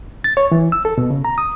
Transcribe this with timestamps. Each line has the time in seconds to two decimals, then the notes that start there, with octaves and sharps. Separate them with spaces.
0.24 A6
0.37 C#5
0.52 E3
0.72 E6
0.85 A4
0.98 B2
1.10 C#3
1.25 A#5
1.38 D#6